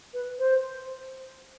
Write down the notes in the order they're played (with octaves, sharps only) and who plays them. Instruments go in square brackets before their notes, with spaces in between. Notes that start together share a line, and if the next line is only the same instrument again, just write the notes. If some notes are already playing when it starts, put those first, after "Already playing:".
[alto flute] B4
C5